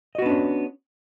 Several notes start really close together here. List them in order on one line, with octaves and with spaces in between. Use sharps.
D#5 F#4 B3 D4 C#4